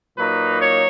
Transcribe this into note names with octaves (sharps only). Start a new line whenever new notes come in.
A#2 F#3 A#3 D#4 B4
C#5